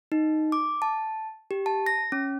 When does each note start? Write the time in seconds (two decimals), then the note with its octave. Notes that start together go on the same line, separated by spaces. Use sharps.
0.12 D#4
0.52 D6
0.82 A5
1.51 G4
1.66 A5
1.86 A#6
2.12 C#4